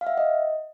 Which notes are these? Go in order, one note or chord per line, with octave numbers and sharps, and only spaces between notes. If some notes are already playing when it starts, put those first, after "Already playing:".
F5
E5
F#5
D#5